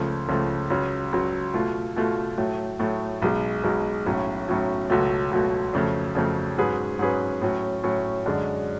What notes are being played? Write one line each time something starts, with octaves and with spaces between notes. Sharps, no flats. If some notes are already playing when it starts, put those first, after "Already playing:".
Already playing: C#2 C#3 F3 A3
C#2 C#3 F3 A3
C#2 C#3 F#3
C#2 C#3 F#3
B2 A3 F4
B2 A3 F4
A2 F#3 A3
A2 F#3 A3
B1 B2 G#3
B1 B2 G#3
B1 A2 F#3 C#4
B1 A2 F#3 C#4
C#2 B2 F#3 A3
C#2 B2 F#3 A3
F2 C#3 F#3 A3
F2 C#3 F#3 A3
G#2 F#3 C#4 G#4 B4
G#2 F#3 C#4 G#4 B4
A2 F#3 C#4
A2 F#3 C#4
F#2 D3 G#3 D4